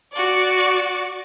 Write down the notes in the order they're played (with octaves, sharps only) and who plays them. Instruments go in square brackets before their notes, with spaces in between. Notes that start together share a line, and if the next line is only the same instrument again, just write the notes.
[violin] F#4 D5